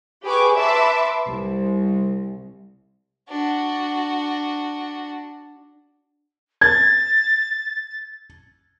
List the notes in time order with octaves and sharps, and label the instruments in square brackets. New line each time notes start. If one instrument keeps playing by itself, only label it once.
[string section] G4 G#4 B4 C#6 D6
B4 E5 A5 C6 D6
C2
[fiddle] D4 F#4
[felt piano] G#6 [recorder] A6